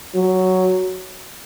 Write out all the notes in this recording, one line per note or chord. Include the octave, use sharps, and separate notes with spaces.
F#3